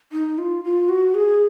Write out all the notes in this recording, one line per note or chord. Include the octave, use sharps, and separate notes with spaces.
D#4
F4
F4
F#4
G#4